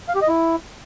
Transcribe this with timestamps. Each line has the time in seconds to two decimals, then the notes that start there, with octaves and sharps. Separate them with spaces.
0.09 F5
0.15 G4
0.22 D#5
0.28 E4